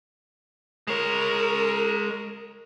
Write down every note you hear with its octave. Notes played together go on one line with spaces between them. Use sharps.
G#3 A#4 C#5